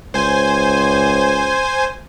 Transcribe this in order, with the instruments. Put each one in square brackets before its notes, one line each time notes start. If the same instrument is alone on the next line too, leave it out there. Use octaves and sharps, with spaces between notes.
[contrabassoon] C#2 [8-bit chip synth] C5 G#5